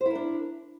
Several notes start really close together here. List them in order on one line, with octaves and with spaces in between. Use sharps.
C5 E4 A#4 D4